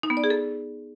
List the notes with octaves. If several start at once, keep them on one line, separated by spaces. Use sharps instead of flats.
D#4
B3
D5
G#4
A4